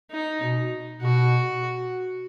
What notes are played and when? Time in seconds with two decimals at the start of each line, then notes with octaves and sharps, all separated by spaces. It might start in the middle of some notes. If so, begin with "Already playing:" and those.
0.11 D#4
0.41 B2
1.01 B2 F#4